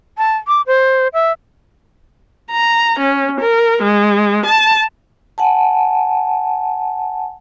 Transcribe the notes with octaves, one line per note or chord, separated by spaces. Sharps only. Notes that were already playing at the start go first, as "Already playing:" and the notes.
A5
D6
C5
E5
A#5
C#4
A#4
G#3
A5
F#5 G#5 A5